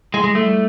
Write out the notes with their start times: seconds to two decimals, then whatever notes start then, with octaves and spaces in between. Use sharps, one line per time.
0.13 G#3 E4
0.24 G#3
0.29 G3
0.35 A3
0.45 G3